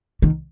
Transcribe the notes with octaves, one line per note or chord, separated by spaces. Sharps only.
D#3